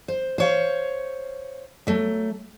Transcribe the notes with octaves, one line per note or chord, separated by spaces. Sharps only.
C5
C5 C#5 F5
F#3 A3